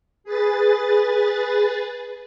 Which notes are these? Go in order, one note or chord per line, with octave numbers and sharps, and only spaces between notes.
G#4 B4 A6